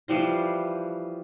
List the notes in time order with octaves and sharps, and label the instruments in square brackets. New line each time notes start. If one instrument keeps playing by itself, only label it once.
[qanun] E3 F3 G3 C6